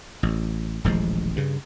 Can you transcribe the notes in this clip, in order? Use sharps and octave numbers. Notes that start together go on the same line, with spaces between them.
A1
D#1 A1 F3 G#3
G2 C#3